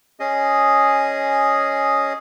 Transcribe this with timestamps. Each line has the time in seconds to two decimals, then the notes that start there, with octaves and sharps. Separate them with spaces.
0.20 C#4 G#4 D#5